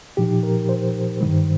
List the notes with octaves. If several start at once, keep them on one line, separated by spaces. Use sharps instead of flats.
A#2 F3 D#4 G4
A#4
C5
G2 D#3 G3